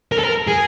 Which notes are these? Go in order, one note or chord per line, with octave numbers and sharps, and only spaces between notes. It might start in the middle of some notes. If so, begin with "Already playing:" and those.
A#4
A4
A#4
G#4